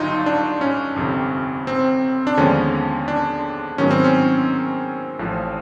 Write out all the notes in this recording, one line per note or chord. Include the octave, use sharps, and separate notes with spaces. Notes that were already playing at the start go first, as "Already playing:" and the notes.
Already playing: G1 G2 D3 F#3 D#4 F4
D4
C#4
G1 F2 C3
C4
D4
D#2 D3 F3 G#3 B3 C#4
D4
G#2 D#3 F#3 B3 C#4
C4
C#4
A1 A2 F3